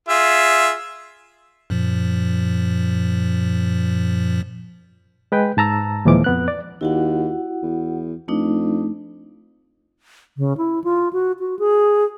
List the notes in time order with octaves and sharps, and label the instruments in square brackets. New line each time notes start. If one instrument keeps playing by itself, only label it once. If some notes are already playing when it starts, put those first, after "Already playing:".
[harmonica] F4 G#4 E5
[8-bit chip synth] F#2 A#2 F3
[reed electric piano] G#3 B4 G5
G#2 A5 A#5 E6
D#2 A#2 E3 F3 G#3 D6
F2 B3 F#6
D5
[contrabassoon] D#2 [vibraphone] E4 F#4 F#5
[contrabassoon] E2
[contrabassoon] F2 [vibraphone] A3 D4 D#4
[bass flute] C#3
E4
F4
F#4
F#4
G#4